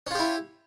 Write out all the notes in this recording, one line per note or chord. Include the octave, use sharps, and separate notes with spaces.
C#4 E4 F4 G4